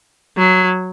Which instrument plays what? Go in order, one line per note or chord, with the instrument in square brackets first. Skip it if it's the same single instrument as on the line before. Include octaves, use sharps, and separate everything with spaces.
[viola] F#3